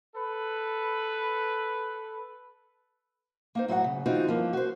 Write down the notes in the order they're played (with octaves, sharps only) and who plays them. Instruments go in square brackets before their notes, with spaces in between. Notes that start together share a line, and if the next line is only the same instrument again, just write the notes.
[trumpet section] A4 B4
[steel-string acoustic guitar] A#3 D#4 C5
A2 F#3 F#4 F5 F#5
C#3
E3 C4 D#4 F4 F#4
G2 F3 A#3
F#4 C5